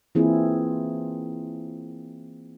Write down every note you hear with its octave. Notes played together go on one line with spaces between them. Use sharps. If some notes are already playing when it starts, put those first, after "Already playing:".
E3 A#3 C4 E4 F4 G#4